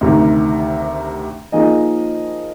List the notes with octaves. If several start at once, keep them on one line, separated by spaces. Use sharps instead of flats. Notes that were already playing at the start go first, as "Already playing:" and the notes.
D2 C3 D#3
F3 A#3 D#4 G#4 D#5